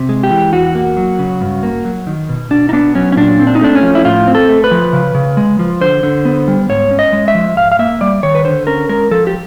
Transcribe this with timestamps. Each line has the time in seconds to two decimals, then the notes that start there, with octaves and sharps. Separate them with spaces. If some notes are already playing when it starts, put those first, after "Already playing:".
Already playing: C3
0.09 G#3
0.23 G4
0.31 E3
0.53 E2 F#4
0.75 A#3
0.97 F#3
1.19 C#3
1.41 G2
1.63 A#3
1.85 F#3
2.07 D#3
2.29 B2
2.51 B2 D4
2.69 D#4
2.73 B3 D4
2.95 F#3 C#4
3.12 C#4
3.17 A#2 D4
3.40 C4
3.47 D4
3.55 D#4
3.61 A3 D4
3.75 C#4
3.83 F3
3.95 E4
4.05 A2 F4
4.27 C4
4.35 A4
4.49 A3
4.64 B4
4.71 F3
4.93 C#3
5.15 C#3
5.37 G#3
5.59 F3
5.81 D3 C5
6.03 D3
6.25 B3
6.48 G3
6.69 G#2 C#5
6.91 C#4
6.99 D#5
7.13 G#3
7.28 E5
7.35 F3
7.57 G#2 F5
7.72 F5
7.79 A#3 E5
8.01 G3 D5
8.23 D#3 C#5
8.35 B4
8.45 D3 C5
8.67 C#4 A#4
8.89 G#3 A#4
9.11 F3 A4
9.27 G4